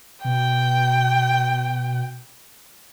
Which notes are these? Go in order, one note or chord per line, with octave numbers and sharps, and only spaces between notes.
B2 G5